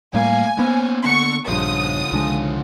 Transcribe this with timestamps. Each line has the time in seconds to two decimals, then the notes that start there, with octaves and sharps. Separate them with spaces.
0.14 A2 G3 A3 A#3 F5 G#5
0.58 A#3 B3 C#4 C5
1.05 D3 C#6
1.48 A#1 G2 C#3 F3 D#6
2.12 C2 D3 G#3